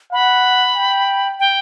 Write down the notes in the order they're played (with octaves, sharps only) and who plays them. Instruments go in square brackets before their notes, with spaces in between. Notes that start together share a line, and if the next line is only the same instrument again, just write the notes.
[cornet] F#5 [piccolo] B5
[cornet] G5
[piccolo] G5